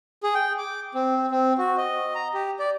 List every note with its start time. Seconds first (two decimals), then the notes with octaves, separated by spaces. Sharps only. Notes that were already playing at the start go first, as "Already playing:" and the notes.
0.23 G#4
0.35 G5
0.58 D6
0.94 C4
1.31 C4
1.58 F#4
1.78 D#5
2.15 A#5
2.34 G4
2.59 D5